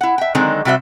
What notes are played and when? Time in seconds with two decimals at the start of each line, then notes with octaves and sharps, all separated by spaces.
0.01 E4 F#5
0.18 E5 G5
0.35 D3 D#3 F#3 G#3 C4 D#4
0.65 C3 G3 F#4 C5 E5